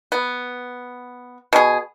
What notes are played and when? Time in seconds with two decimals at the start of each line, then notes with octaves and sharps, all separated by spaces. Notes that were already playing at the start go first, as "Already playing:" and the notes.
0.12 B3
1.53 B2 G#4